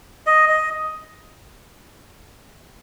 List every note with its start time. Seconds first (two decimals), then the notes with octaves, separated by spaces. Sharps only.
0.27 D#5
0.49 D#5